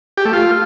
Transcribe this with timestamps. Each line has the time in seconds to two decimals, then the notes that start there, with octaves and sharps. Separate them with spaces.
0.17 G4
0.25 A3
0.33 F4